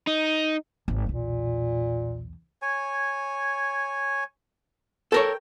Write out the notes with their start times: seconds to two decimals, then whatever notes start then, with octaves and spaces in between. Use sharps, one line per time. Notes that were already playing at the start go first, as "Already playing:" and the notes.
0.07 D#4
0.88 G#1
1.06 B1 E2 A#2
2.62 C#5 G#5
5.12 A4 A#4 C#5 G5